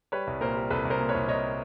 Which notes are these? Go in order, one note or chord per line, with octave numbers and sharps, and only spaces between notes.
G3 B4 C#5
C2
A#2 A#4 C5
G3
C2 A4 B4
C2
A#4 C5
A#2
B4 C#5
C2
C2 C#5 D#5